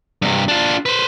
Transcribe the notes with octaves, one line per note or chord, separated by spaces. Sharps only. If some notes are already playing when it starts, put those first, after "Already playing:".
G2 C3
D4 F4
B4 C5